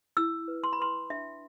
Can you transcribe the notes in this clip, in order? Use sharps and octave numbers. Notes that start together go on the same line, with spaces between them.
E4 E6
B4
C6
B5
B4 C6
D4 E5